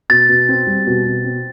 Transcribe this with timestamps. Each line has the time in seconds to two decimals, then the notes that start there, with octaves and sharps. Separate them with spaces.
0.10 B2 A6
0.29 B2
0.49 C4
0.67 G3
0.86 B2
1.05 B2
1.25 C4